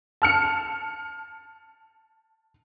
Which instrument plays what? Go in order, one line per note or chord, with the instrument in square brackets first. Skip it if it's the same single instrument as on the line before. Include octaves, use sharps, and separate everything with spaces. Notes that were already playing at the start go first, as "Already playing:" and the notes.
[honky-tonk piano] A5 F6 C#7